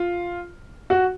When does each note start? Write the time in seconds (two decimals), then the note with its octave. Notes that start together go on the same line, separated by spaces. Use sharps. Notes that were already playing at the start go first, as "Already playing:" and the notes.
Already playing: F4
0.90 F#4